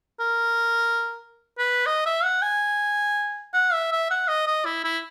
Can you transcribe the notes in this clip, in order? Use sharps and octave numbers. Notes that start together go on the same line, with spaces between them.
A#4
B4
D#5
E5
F#5
G#5
F#5
E5
E5
F#5
D#5
D#5
E4
E4